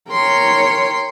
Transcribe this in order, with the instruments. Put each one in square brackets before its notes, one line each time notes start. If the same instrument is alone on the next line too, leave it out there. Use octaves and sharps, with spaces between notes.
[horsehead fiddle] A#4 C#5 [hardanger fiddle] G5 C6